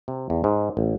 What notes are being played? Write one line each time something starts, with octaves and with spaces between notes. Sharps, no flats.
C3
E2
G#2
A1